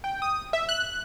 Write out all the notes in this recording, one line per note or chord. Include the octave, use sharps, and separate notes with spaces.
G5
D#6
E5
F#6